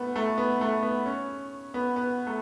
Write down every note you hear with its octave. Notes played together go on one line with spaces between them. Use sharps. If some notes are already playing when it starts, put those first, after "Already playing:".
Already playing: A3 B3
A3
B3
A3
B3
C#4
B3
B3
A3